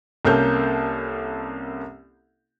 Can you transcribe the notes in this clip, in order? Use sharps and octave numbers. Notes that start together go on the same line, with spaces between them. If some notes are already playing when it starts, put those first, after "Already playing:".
C2 A#3 C#4 A4 G6